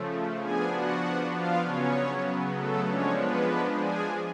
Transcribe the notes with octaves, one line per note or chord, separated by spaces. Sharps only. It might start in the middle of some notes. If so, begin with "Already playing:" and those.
Already playing: C#3 F3 A3
F3 B3 D4 G#4 G#5
F#4 F#5
F4 F5
C#3 F#3 B3 C#4 C#5
A3 A4
F3 G#3 C#4 D4 C#5
B3 B4
G#4 G#5